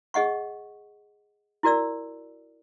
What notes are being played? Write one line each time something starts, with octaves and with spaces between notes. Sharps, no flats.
G#4 D#5 F#5 C#6
E4 F#4 A#4 D5 E6